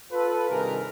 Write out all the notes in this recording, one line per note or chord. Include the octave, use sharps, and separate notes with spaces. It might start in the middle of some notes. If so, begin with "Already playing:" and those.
F4 A4 B4
G2 C3 D#3 G#4 A#4